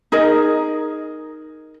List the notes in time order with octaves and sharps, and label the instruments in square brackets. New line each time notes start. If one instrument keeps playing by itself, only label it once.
[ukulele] D#4 G#4 A#4 D#5